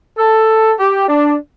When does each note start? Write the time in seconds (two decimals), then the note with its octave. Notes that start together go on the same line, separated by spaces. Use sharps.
0.19 A4
0.80 G4
1.09 D4